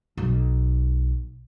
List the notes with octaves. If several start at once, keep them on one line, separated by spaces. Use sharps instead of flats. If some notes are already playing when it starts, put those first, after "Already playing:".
B1